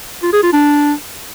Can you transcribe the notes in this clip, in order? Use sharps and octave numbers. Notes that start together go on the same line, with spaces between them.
F4
G#4
F4
D4